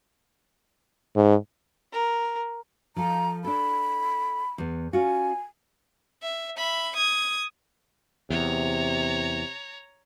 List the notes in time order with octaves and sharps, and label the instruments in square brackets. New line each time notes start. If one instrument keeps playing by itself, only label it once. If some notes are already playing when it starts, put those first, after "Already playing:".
[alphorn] G#2
[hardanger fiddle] A#4
[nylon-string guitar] F3 F4 A4 [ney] A#5
[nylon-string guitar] D4 A4 [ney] B5
[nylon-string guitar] E2 B3
[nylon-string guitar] C#4 F4 F#4 [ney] G#5
[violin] E5
E5 B5
D#6 G#6
[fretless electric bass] E2 [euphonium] C3 [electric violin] C#5 A#5